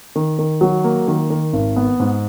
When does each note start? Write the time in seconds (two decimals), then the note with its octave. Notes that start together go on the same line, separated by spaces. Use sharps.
0.15 D#3
0.39 D#3
0.61 F#3
0.84 A#3
1.08 D#3
1.30 D#3
1.53 G#1
1.76 B3
2.00 G#2